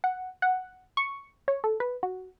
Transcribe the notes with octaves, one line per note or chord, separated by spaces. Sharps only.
F#5
F#5
C#6
C#5
A4
B4
F#4